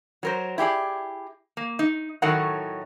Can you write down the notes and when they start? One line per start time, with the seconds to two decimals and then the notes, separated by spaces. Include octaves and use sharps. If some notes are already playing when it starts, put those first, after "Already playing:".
0.23 F#3 A#4 C5
0.58 E4 G4 G#4 D5
1.57 A#3
1.79 D#4
2.22 A2 D#3 F#3 A3 A#4 F#5